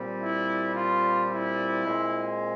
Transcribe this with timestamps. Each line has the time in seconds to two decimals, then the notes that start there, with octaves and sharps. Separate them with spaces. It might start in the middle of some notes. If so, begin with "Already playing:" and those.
Already playing: A#2 G3 C4
0.21 E4
0.75 F4
1.31 E4
1.86 A#2 G#3 C4